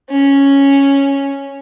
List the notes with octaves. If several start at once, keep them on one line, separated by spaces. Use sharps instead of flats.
C#4